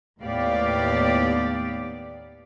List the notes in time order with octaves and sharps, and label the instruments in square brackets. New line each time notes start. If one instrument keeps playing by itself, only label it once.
[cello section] D#2 A2 B3 G4 D5 F5